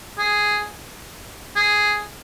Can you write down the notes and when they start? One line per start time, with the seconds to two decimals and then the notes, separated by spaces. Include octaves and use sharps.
0.18 G#4
1.56 G#4